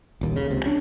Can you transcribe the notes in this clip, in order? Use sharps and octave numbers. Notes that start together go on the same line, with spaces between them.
D#1 D#2
C#3
C#2 C3
C#4 D4